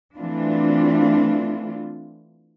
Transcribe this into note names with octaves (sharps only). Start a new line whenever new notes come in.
E3 A3 C4 D4 F4